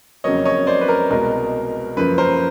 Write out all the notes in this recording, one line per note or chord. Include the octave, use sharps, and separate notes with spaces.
F2 C#3 F#3 A#3 C#5 D#5
C#5 D#5
C5 D5
B4
A#4
C2 B2 G#3 A#4
F#2 C#3 F3 A#3 B4
A#4 C5